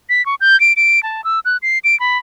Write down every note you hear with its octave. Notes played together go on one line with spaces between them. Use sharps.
B6
C#6
G6
D7
D7
A5
E6
F#6
C7
D7
B5